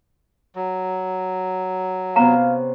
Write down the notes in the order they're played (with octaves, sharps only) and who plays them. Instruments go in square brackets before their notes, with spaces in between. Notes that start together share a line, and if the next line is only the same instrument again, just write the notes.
[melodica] F#3
[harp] C3 B3 C#4 [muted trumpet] F5 [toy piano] A#5